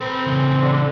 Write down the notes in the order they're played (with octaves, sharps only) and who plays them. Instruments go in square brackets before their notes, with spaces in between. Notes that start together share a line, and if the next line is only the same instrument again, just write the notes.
[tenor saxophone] C4 [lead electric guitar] A4 B4
[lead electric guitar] C#3 E3
[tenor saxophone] D3